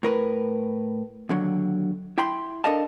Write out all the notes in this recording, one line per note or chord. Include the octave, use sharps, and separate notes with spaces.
A2 A#4 B4
D#2 D3 F#3
E4 G5 B5 C6
D4 A4 A#4 D#5 F5 A5